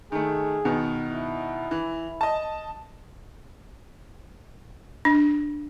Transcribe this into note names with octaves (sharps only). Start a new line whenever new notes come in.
D#3 A3 G#4
B2 D#3 B3
E4
E3
D#5 A5
D4